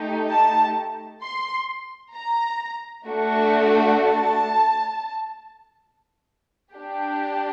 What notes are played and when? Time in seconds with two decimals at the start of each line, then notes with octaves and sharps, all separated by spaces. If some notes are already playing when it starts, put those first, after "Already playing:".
Already playing: A3 D#4 G4
0.31 A5
1.23 C6
2.15 A#5
3.07 A3 D4 F#4 A4
3.98 A5
6.74 D4 G4